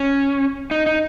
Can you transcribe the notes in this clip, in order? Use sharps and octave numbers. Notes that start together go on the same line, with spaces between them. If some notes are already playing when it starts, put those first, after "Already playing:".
Already playing: C#4
D#4
D#4